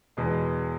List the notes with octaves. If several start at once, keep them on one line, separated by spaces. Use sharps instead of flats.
E2 B2 G#3